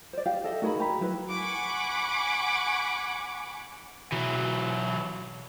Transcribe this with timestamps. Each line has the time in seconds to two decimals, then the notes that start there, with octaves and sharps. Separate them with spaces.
0.13 C5 D5
0.26 G4 F5
0.44 A4 D#5 E5
0.62 A3 D#4 F#4 G#4 A#4 B5
0.80 G5 A#5 B5
1.01 F#3 E4 B4
1.31 F#5 G#5 B5 C#6 D6
4.12 B2 E3 F#3